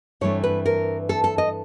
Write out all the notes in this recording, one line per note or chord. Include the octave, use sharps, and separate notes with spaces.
G2 E3 A3 C4 C#5
B4
A#4
A4
A4
D#5